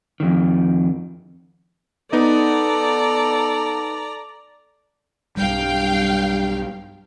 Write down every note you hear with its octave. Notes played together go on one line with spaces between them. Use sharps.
F2 D#3
B3 D#4 A4 D5 D#5 A#5
B1 G2 G3 F5 G5